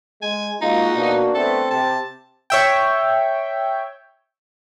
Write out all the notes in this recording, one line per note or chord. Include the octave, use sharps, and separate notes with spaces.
G#3 G#5
G#3 A#3 D#4 F4 F#4
B2 D4
A3 B3 C4 A4
C3 A5
C#5 E5 G5